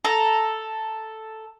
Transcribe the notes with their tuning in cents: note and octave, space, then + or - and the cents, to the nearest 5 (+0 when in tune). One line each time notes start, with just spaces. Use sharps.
A4 +0 A#5 +0